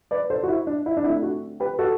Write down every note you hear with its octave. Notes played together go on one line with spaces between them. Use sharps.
B4 D5
A4 C5
F#4
E4
D4
E4
D4
D3 A3 C4 E4
D4 F#4
G4 B4
F#4 A4